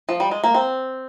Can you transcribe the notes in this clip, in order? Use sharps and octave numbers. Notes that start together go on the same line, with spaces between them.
F3
G3
G#3
A#3
C4